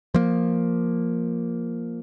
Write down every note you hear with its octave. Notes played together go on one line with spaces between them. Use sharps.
F3 A#3